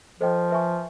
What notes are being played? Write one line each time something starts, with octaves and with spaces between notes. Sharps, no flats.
F3 A4 C5 D#5 G5
B4 E5 G#5 C#6